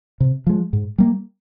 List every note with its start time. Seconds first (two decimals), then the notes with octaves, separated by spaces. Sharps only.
0.20 C3
0.47 F3 G#3
0.73 G#2
0.98 G3 A#3